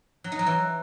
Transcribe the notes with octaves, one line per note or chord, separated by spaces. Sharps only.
F#3
D#4
F#3
E3